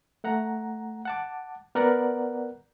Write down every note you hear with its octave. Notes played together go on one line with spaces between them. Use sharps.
A3 F#5 A#5
F#5 A5 D6
B3 A#4 D5 F#5 A#5 F#6